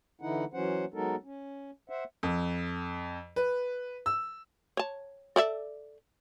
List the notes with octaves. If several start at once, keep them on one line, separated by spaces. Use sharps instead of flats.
D3 E3 D#4 E4 F#5
E3 F#3 C#4 C5 F#5
F#3 G#3 B3 D#4 A4 A#4
C#4
C5 E5 F#5
F2
B4
E6
C#5 A5
A4 D5 E5